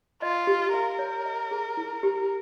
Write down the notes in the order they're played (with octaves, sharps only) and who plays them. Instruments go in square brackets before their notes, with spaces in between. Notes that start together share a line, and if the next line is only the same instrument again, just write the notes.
[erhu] F4 [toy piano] D#5
[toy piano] G4
[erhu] A#4 [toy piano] F5
[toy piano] C#5
D#5
G#4
E4
G4